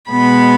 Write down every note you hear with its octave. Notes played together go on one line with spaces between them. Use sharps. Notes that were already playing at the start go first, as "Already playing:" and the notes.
B2 G#3 B3 B5